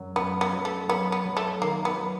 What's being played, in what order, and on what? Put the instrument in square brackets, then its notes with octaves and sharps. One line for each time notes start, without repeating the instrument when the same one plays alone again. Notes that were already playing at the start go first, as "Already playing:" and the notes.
Already playing: [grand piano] F#2 F#3
[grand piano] F#2 [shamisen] B3
[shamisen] B3
[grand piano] F#3
[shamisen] A3
[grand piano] F#3 [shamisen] B3
[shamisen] B3
[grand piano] F#3
[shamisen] A3
[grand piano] D#3 [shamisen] A#3
[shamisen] B3
[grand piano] F#3